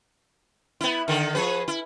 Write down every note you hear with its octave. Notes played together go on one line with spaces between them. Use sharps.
B3 E4
D3 D#3 A4
F3 G#4 B4
E4